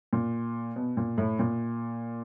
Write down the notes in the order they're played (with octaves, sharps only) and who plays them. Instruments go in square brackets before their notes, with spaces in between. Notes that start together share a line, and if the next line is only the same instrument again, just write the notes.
[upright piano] A#2
B2
A#2
A2
A#2